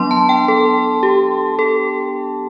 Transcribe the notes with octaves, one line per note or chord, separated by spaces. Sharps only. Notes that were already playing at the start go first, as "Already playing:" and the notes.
Already playing: F#3 B3 D4 C6
A5
G5
A4
G4
A4